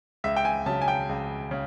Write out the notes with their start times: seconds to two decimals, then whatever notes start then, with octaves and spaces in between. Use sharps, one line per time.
0.24 C#2 E5
0.36 G5
0.45 G#5
0.66 C#3 F#3 A5
0.82 G#5
0.88 G5
1.09 C#2
1.51 C#3